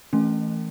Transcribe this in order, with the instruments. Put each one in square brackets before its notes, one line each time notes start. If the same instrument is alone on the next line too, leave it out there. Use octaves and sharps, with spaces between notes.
[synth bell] E3 A3 C#4